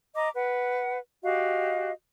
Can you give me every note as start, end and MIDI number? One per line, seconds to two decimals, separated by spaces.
0.15 0.28 75
0.15 0.28 82
0.15 0.28 86
0.33 0.98 71
0.33 0.98 78
1.23 1.90 66
1.23 1.90 67
1.23 1.90 75
1.23 1.90 77